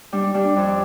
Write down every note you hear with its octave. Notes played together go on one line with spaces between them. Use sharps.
G3 D4
D4
G3 D4
F2 D4